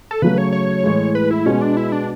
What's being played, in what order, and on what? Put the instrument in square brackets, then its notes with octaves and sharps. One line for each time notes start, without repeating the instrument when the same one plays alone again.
[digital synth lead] A4
[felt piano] C#3 F#3 A3 [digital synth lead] B4
[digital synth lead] C#5
C#5
[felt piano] A2 E3 G#3
[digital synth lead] B4
E4
[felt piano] B2 G#3 B3 [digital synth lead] C#4
[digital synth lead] D4
E4
D4